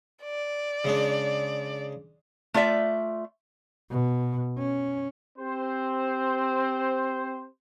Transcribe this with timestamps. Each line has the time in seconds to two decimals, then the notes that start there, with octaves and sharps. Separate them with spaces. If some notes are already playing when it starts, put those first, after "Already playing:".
0.23 D5
0.85 C#3 G#3 D4
2.54 A3 F4 D5 E5
3.90 B2
4.58 C#4
5.39 C4 G4 C5